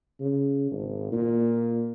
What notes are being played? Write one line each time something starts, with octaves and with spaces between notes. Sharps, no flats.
C#3
G#1
A#2